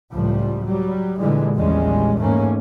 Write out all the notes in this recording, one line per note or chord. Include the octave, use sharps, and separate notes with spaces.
C#2 A2 F3 G3
F#3 G3
A#2 D3 E3 G3 G#3
A#1 E2 G3 G#3 C#4
E2 G#2 A3 A#3 C#4